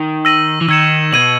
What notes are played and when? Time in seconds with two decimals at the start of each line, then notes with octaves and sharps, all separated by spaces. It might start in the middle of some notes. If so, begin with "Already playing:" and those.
Already playing: D#3
0.25 E6 A#6 D#7 F#7
0.61 E3
0.68 D#3 E6 G#6 C#7 E7
1.12 B2 G#6 D#7 F#7